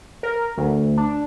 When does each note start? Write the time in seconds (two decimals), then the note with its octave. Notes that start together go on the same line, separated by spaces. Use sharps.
0.23 A#4
0.58 D2
0.97 D4